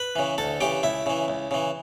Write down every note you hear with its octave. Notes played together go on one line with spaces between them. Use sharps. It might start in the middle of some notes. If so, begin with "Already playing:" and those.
Already playing: B4 B5
C#3 E3
D2 A4 A5
C#3 E3 G4 G5
C#2 E4 E5
C#3 E3
C#2
C#3 E3